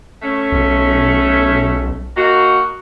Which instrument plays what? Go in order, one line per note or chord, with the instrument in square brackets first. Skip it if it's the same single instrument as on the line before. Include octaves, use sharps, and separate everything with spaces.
[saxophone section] A3 C#4
[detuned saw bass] B1
[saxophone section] A#3 D#4 F#4